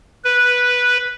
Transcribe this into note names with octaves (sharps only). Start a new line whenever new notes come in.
B4